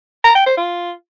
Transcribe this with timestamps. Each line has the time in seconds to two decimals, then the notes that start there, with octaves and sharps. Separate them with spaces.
0.24 A#5
0.35 G5
0.46 C5
0.57 F4